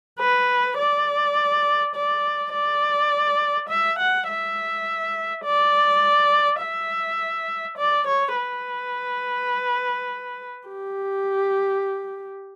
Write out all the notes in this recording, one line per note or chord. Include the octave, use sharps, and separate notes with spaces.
B4
D5
D5
D5
E5
F#5
E5
D5
E5
D5
C#5
B4
G4